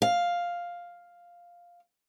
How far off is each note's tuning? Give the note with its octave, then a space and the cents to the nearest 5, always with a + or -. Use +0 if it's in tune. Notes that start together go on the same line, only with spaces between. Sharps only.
F5 +5